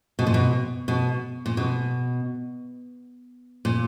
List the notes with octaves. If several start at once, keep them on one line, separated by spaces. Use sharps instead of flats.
B2
A#2
B2
B2
A#2
B2
A#2